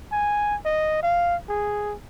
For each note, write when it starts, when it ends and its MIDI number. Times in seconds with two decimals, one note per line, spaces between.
0.12 0.56 80
0.65 1.01 75
1.03 1.35 77
1.49 1.95 68